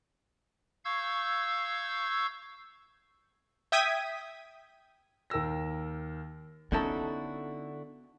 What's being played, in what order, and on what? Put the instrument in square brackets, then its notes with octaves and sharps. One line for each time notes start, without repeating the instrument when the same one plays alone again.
[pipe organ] F5 C#6 E6 G6 G#6
[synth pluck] E5 G5 D#6 G#6 B6 D#7
[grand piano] D#2 A#4 G5 E6 A#6
[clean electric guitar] D3 E4 F#4 [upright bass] B3 [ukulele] C#4 D#4 A4